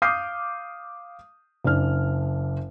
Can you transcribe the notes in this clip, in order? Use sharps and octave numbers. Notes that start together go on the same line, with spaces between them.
F5 D6 D#6 F6 G6 C7
F#1 D4 F6